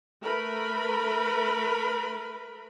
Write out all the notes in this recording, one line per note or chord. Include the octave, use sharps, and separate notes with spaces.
A3 A#4 B4 B5